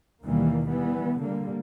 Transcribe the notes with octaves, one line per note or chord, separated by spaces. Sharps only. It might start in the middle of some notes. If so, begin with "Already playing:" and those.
D#2 B2 D#3 E3 G3 A#3
E3 G3 B3
D3 G3 A#3